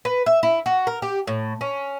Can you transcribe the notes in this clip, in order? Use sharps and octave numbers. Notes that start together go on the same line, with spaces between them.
B4
E5
E4
F#4
A#4
G4
A2
C#4